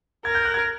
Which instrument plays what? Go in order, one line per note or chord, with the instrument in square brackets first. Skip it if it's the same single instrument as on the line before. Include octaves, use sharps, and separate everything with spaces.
[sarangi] A#4 [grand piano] G#6
[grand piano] G6
F#6
G#6